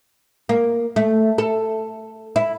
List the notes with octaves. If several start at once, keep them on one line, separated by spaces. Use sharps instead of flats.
A#3
A3
A4
E4